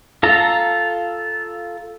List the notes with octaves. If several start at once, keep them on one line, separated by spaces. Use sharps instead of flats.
F4 A4 A#5